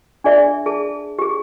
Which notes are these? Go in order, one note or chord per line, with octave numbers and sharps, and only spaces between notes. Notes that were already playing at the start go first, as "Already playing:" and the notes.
D4 G#4 D5 E5
G#4 A5
G4 G#4